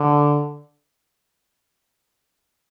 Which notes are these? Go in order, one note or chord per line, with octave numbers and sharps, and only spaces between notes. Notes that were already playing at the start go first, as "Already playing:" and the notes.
Already playing: D3